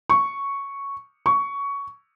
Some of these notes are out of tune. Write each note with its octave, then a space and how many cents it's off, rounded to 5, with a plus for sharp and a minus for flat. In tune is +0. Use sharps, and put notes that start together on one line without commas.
C#6 +0
C#6 +15